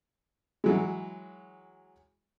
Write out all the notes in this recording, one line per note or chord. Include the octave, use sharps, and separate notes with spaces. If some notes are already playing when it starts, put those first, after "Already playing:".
E3 F#3 G#3